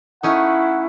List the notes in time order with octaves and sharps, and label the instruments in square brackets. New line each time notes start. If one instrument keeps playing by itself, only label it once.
[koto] A3 C#4 D#4 [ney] E4 [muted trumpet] F#5